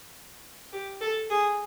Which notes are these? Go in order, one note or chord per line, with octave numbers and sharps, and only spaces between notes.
G4
A4
G#4